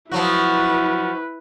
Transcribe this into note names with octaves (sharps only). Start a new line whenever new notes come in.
F3 F#3 E4 F#4 B4